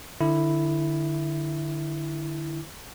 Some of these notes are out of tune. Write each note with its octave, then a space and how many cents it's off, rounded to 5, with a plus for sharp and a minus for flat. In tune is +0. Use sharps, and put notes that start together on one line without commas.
D3 +25 E4 +0